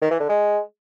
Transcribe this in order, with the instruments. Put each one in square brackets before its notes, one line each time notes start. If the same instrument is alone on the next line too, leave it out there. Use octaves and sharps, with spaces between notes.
[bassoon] D#3
E3
D3
G#3